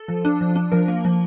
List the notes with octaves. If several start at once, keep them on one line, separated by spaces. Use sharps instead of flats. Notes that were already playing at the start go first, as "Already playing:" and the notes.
Already playing: A4
F3
D4
F3
D4
F3 A#4
A#3
F3